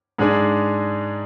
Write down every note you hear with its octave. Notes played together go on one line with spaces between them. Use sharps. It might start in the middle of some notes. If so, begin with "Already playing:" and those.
G#2 G#3 D4 G#4